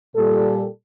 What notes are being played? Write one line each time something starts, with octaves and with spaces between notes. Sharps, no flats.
A#2 G3 A4